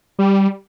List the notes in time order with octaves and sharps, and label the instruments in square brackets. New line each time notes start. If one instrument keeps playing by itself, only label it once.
[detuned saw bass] G3